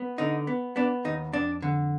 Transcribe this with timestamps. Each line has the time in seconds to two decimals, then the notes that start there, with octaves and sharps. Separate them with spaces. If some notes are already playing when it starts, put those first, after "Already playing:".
Already playing: B3
0.18 D3 D#4
0.47 B3
0.76 B3 D4
1.05 D#2 D#4
1.33 F2 D4
1.62 D3